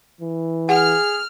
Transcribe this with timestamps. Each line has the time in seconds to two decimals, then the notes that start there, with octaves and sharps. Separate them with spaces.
0.21 E3
0.69 G#4 F#5 F6